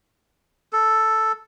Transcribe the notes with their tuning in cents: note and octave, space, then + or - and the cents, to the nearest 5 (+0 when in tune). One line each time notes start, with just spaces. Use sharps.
A4 +0